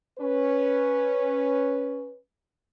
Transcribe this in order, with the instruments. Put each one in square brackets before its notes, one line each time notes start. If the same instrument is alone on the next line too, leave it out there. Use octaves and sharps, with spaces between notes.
[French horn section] C#4 B4